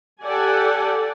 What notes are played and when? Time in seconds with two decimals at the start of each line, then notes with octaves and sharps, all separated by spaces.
0.23 G4 A4 D5 F#5 G#5